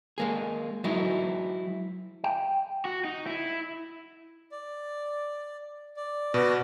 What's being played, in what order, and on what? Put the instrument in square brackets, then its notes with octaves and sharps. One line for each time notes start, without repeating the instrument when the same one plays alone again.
[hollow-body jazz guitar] G#3 A#3 G#4
F#3 G#3 D#4 E4
[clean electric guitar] G5
[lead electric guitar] F#4
D#4
E4
[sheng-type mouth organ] D5
D5
[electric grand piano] B2 [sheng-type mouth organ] F#4 B4 D5